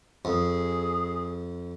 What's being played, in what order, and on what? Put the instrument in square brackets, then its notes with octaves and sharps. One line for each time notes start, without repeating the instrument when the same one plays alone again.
[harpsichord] F2 [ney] G#4